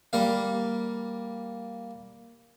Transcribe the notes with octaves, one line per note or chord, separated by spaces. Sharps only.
G3 A#3 F5